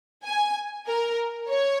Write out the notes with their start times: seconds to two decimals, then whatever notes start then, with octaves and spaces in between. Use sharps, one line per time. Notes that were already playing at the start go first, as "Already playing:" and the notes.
0.25 G#5
0.86 A#4
1.49 C#5